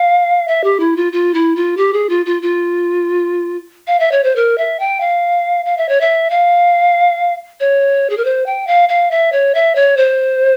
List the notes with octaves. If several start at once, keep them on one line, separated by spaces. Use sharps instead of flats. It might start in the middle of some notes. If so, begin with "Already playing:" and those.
Already playing: F5
E5
G4
E4
F4
F4
E4
F4
G4
G#4
F4
F4
F4
F5
E5
C#5
C5
A#4
E5
G5
F5
F5
E5
C#5
E5
F5
C#5
G#4
A#4
C5
G5
F5
F5
E5
C#5
E5
C#5
C5